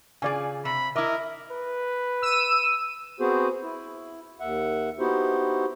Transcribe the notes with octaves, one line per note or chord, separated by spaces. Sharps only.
C#3 F4 G#4 D5 G#5
C3 B5
E4 A#4 D#5 E5 D6
B4
E6 D#7
B3 C4 F#4 G#4 C5
E4
D#2 E5 F#5
B3 D#4 E4 F#4 G4 C5